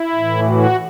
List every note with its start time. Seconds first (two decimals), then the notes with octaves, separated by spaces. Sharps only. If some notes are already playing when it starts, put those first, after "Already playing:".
Already playing: E4
0.14 A2 E3
0.47 F#4